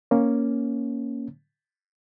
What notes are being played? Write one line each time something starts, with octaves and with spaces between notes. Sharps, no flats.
A#3 C#4